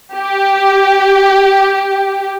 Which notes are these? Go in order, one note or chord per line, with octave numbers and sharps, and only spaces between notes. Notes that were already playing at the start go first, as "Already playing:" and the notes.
G4